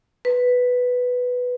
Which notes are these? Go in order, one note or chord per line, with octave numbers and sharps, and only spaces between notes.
B4